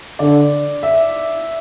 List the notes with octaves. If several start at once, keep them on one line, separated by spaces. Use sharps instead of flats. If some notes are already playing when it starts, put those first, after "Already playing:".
D3 D5
E5